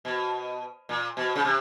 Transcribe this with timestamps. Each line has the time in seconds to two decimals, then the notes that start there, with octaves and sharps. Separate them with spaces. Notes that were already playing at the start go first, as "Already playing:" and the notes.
0.05 B2
0.89 A#2
1.17 B2
1.35 C#3
1.45 C3